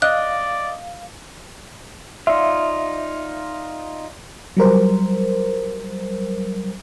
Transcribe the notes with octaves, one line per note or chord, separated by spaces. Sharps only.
D5 D#5 F5 F#6
D#4 F4 D5 E5 F5 C6
F#3 G3 A#4 C5